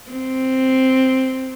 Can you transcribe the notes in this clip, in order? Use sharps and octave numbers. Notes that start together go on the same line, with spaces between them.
C4